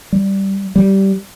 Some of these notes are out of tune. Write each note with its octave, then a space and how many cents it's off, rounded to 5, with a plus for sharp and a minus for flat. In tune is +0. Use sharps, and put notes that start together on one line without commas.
G3 -5
G3 -15